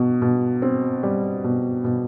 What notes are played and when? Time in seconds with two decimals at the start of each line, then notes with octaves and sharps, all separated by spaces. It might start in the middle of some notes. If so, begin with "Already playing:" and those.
Already playing: B2
0.22 B2
0.62 C4
1.03 G3
1.44 B2
1.84 B2